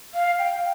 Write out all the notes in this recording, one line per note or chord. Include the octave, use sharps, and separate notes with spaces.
F5
G5